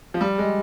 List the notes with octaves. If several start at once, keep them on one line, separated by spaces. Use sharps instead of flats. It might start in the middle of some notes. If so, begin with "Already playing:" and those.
F3
G3
G#3